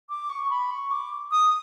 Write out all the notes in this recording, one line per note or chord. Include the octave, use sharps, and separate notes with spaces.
D6
C#6
B5
C#6
D6
D#6